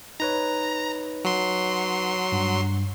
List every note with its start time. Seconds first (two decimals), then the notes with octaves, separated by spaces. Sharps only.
0.20 D#4 B4 C#5 A#5
1.25 F#3 C6
2.32 G2